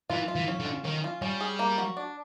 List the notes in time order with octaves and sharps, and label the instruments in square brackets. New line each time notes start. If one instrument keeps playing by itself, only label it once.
[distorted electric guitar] E3 [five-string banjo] F4
[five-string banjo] F4
[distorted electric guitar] E3
[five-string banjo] C#4
[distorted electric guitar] D3
[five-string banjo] F4
[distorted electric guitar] D#3 [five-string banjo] C#4
[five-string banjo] F4
[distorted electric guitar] G3 [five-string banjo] C#4
[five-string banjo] G#4
A#3
F#4
D4